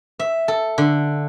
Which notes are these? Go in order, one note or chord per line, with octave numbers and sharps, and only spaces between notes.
E5
A4
D3